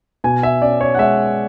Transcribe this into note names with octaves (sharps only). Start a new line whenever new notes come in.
B2 G#5
E5
C#4 D5
C#5
F#5
G#3 E5